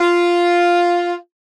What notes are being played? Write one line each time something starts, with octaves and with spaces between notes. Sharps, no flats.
F4